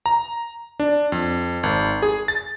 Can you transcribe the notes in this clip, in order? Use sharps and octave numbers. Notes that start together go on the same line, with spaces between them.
A#5
D4
F2
G#1
G#4
A6